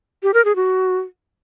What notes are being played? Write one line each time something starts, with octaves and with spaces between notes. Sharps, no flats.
G4
A#4
G#4
F#4